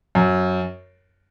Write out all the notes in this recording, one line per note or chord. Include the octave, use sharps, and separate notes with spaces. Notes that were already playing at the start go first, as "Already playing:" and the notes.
F#2